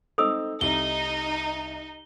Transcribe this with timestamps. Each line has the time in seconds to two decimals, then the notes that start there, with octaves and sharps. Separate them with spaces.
0.18 C4 D#4 A4 D#6 E6 F7
0.61 C2 D#4 G7